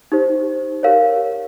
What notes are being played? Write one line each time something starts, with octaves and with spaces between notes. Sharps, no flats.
D#4 G4 C5
G4 A#4 C#5 F5